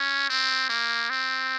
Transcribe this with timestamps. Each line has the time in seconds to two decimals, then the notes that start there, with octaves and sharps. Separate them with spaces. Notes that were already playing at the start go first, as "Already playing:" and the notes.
Already playing: C#4
0.29 C4
0.69 A#3
1.10 C4